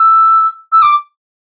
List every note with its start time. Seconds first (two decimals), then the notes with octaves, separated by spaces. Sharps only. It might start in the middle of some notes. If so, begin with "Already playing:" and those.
Already playing: E6
0.72 E6
0.82 D6